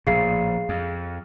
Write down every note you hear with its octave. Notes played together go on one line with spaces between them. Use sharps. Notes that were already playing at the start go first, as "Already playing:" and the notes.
A#1 A2 G#4 F5 C7
F2